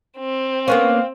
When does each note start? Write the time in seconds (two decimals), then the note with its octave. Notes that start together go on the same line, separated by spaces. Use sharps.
0.18 C4
0.68 A#3 B3 C#4 F5